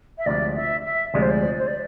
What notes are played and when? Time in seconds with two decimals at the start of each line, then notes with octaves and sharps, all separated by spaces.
0.18 E5
0.26 D2 C3 F3 G#3 D5
0.55 E5
0.84 E5
1.14 D2 C3 F3 G#3 D5
1.22 C5
1.30 D5
1.58 C5
1.67 D5